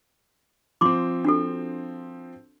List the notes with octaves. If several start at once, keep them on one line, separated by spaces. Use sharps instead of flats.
F3 C4 C6 D6
D4 F#4 A4